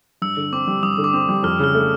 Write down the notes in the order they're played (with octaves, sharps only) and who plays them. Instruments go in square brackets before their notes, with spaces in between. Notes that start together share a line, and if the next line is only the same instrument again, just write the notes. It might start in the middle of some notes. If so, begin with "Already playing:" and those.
[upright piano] G2 [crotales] E6
[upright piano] D3
[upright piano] C4 [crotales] D6
[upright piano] G3
[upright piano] G2 [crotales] D#6
[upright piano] D3
[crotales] D6
[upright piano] C4 [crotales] D#6
[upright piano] G3
[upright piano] F2 [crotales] F6
[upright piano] C#3 [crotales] F6
[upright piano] A3